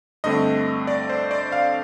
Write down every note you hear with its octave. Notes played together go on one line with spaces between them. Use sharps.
G2 D3 A3 C4 D#5
D5
C5
D5
F5